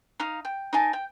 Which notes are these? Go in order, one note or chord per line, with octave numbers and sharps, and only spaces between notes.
D#4 F5 D#6
G5
D#4 A#4 G#5 A5
G5